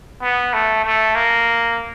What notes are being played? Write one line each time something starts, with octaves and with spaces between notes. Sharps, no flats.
B3
A3
A3
A#3